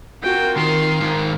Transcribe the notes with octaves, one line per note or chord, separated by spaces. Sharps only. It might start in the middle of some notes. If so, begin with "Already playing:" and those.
C4 F4 F#4 A#4 G5
D#3 C6
G#2 D#3